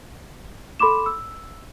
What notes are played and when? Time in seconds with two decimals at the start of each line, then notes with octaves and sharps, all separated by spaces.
0.80 A4 B5 C6 D6 E7
1.06 E6